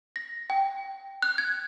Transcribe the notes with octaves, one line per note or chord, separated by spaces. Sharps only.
A#6
G5
F#6
G#6